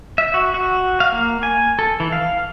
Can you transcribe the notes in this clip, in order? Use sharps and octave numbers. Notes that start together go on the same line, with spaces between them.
E5
F#4
F#4
F5
A#3
G#5
A4
E3
F5